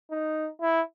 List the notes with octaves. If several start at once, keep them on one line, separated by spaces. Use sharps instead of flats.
D#4
E4